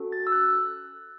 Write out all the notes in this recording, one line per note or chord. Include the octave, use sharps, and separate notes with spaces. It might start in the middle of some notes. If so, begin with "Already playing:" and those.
Already playing: C#4 F#4 A4
A6
E6
F#6